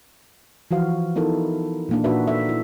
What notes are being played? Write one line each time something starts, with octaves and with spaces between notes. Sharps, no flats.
E3 F3 F#4 F5
B3 D#4 E4 A4 A#4
A#2 A#3 D4
A#2 D4 D#4 F#4 B4 E5
A4 E5
E4